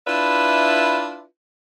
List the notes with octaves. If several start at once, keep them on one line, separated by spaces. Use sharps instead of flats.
D4 E4 F4 B4 D5 E5